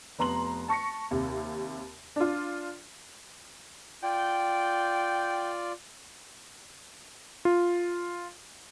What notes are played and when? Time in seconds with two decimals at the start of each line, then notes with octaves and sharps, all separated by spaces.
0.19 F1 B3 A#5 C6 F#7
0.68 A5 C#6 A#6 C#7
1.11 D#2 C3
2.16 D4 F4
4.03 F4 D5 G5
7.45 F4